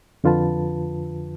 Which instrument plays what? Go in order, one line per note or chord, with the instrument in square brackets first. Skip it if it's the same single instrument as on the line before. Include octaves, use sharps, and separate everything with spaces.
[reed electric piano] F2 D3 F4 B4 A5